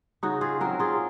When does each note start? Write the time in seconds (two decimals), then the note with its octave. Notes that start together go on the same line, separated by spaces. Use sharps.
0.23 C#3 D#4 F#4
0.41 F4 G#4
0.61 F#3 C4 F#4 A#4
0.79 F4 G#4